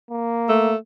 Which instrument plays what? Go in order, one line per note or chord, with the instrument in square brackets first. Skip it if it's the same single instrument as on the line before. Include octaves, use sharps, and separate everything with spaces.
[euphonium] A#3
[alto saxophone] A3